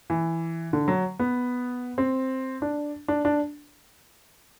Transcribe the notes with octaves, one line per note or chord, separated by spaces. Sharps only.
E3
D3
F#3
B3
C4
D4
D4
D4